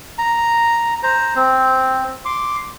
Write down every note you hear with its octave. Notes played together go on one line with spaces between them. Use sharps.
A#5
C5 A#5
C4
C6 D6